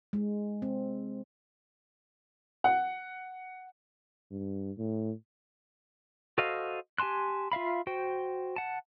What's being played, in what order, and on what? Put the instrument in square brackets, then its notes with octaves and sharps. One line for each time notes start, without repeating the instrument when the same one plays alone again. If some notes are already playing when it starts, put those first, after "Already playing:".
[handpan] G#3
C4
[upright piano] F#5
[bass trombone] G2
A2
[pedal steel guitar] F#4 A4 C5 D#5 F5
G4 G#5 A5 C6 F#6
F4 E5 F5 B5
F#4 C5 G5
F#5 A5